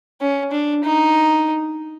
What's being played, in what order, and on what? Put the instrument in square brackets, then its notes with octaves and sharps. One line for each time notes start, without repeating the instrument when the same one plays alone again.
[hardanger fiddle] C#4
D4
D#4